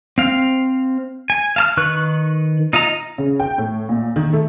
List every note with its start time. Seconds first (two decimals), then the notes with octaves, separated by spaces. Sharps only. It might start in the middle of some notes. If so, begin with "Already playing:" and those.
0.18 C4 F5
1.30 G#5
1.56 F5 A5 F6
1.77 D#3 B4 C#6 F#6
2.73 D#4 F4 D#5 A#5
3.18 C#3
3.40 G5
3.58 A2
3.89 A#2
4.16 D#3
4.33 A3